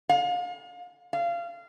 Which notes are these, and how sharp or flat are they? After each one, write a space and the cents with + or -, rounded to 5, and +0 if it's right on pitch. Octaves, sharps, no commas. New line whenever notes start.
F5 +35
F5 -25